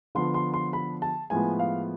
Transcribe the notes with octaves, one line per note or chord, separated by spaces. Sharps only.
D3 F3 B3 C6
C6
C6
B5
A5
A2 F3 G#3 B3 G#5
F5